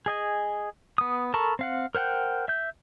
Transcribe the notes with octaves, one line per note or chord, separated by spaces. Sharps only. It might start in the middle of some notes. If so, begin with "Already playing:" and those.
G#4 D#5 G#5
B3 D#6
A4 A#4 A5 B5 C#6
C4 F5 F#5
A#4 C5 F#5 G5
E5 G6